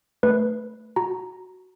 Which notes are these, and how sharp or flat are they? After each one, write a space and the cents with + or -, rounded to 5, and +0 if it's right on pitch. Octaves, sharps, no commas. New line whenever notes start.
A3 +0 B4 +0
F#4 +0 A#5 +0